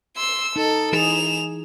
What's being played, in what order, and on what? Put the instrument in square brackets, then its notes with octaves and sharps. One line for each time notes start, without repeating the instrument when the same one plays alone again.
[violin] C6 E6
[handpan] D#4 [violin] A4
[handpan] E3 D#4 G#4 [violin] E7 F7